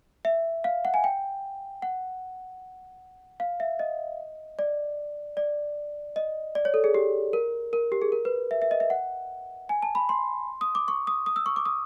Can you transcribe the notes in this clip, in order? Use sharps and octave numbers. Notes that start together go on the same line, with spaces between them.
E5
F5
F#5
G#5
G5
F#5
F5
E5
D#5
D5
D5
D#5
D5
C#5
A4
G#4
G4
A#4
A#4
G4
G#4
A#4
B4
E5
E5
D#5
E5
F#5
G#5
A5
B5
C6
D#6
D6
C#6
D#6
D#6
E6
C#6
D6
D#6